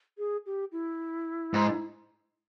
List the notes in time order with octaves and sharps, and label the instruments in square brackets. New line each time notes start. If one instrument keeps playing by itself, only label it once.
[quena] G#4
G4
E4
[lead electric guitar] G#2